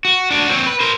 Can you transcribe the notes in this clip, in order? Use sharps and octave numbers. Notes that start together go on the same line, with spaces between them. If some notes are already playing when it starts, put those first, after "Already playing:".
F#4
D4 F#4
C4 C#5
B4
A#4 C5